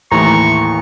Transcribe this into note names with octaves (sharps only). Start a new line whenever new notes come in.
D#2 A2 E3 A#5 C#6